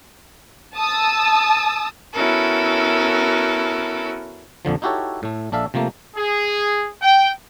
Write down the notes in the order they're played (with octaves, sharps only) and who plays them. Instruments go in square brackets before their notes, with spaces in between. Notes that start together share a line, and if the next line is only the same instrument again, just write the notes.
[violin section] A5 D#6 E6
[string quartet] B3 C#4 E4 F#4 A4 A#4
[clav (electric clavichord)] A#1 F2 D3 F3
D#4 E4 F#4 G4 A4 C#5
A2 A3
A#1 D4 A4 E5 F5
C3 F3 A3 A#3
[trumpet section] G#4
G5